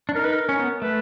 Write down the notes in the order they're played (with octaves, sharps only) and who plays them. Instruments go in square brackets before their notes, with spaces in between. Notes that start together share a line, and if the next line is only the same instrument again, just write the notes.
[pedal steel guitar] D4
[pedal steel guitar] D#4 [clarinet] A#4
[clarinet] B4
A#4
[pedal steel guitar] C#4
B3
[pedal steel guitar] A3 [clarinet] B4